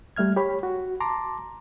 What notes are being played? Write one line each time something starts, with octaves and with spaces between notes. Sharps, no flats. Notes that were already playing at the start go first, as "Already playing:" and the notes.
G3 A3 E5 F6 G#6
G4 C#5 B5
F#4
A5 A#5 C6 D6